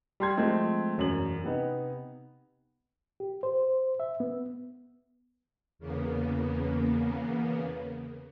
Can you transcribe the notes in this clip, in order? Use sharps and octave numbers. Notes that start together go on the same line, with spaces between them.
G3 C6 G#6
F3 G#3 A3 C4
E1 F#2 F#7
C3 B3 D#4
G4
C5
E5
B3
E2 C#3 A#3 B3